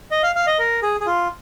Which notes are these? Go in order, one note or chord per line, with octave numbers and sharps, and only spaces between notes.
D#5
F5
F5
D#5
A#4
G#4
G#4
F4